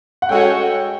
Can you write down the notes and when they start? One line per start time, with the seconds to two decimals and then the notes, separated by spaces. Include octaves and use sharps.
0.22 F#5
0.29 G#3 C#4 F#4 A4 C#5 G5